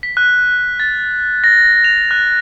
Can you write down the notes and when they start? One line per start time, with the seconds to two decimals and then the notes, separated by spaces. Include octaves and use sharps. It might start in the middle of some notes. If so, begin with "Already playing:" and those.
0.03 B6
0.17 F#6
0.80 A6
1.44 A#6
1.84 F7
2.11 F#6